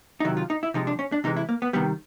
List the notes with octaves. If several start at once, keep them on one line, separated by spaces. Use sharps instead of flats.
D#4
C3 D#3 F#3 E4
F4
D#4
E4
C3 F3 G#3 D#4
D4
C#4
D4
C3 E3 G#3 D#4
E4
A#3
B3
C3 D#3 G3 B3